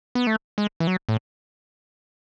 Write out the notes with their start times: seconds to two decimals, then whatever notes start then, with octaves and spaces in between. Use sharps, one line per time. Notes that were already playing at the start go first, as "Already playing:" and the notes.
0.15 B3
0.27 A3
0.58 G#3
0.80 E3
0.87 F#3
1.09 A2